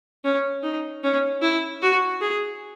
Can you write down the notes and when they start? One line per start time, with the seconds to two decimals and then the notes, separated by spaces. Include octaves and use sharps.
0.24 C#4
0.63 D#4
1.03 C#4
1.42 E4
1.82 F#4
2.21 G#4